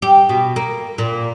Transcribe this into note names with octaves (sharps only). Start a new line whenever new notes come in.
G4
B2
A#3
A#2